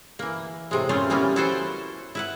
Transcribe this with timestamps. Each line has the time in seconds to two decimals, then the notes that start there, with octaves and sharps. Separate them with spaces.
0.19 E3 A#3
0.71 A2 C3 G#3
0.89 A#2 G3 A3 C4 C#4 F4
1.10 E3 G3 A#3 B3 C#4
1.36 E4 F#4 A4 B4 C5 G5
2.15 E4 B4 F#5